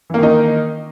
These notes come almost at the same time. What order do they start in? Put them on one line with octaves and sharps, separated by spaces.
E3 A#3 D#3 D#4